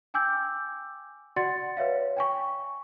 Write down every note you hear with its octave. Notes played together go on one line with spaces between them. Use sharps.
G5 G#5 D6 E6 G6
F#4 D5 F#5 C6 A6 C#7
B4 C#5 E5 F5
G5 G#5 C#6